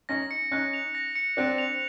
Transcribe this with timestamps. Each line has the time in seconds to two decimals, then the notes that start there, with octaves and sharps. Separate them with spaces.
0.09 C#4 D#4 A#6
0.31 C#7
0.52 C#4 D#4 F#6
0.73 F7
0.95 A#6
1.15 C#7
1.37 C4 D4 F#6
1.58 F7